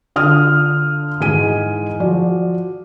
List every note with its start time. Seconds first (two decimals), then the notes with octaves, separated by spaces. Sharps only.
0.16 D3 F4 D#6 F6
1.21 G#2 E3 G#3 D#4 G#5 D#7
2.00 F3 F#4 D5